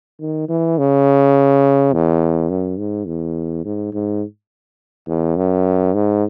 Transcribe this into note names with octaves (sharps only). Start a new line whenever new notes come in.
D#3
E3
C#3
E2
F#2
G#2
E2
G#2
G#2
E2
F#2
G#2